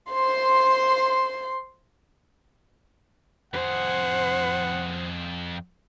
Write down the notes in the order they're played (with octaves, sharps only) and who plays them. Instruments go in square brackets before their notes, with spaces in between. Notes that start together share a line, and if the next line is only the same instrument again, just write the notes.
[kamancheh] C5 C6
[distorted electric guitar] F2 G#4 [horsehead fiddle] C5 [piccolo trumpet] F#5